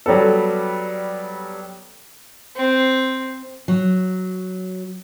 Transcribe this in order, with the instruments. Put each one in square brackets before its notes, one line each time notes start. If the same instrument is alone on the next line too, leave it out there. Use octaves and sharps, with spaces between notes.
[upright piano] F#3 G3 B3 A4
[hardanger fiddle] C4
[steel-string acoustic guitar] F#3